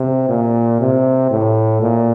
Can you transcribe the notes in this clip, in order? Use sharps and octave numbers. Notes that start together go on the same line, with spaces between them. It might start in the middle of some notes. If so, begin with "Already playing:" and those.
Already playing: C3
A#2
C3
A2
A#2